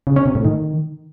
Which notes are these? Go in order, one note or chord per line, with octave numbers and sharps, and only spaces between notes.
C#3
C#4
C3
A2
D#3